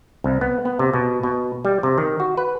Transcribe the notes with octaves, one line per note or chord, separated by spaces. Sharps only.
C2
B3
B3
C3
B2
B2
G3
C3
D#3
F#4
B4